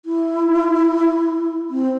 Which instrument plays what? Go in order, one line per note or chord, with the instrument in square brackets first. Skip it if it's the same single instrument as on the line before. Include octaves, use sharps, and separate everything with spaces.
[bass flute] E4
C4